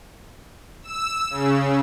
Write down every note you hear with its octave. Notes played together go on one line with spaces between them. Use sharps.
E6
C#3